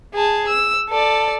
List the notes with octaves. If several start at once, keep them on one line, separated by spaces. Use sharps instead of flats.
G#4 A5
E6
A4 D5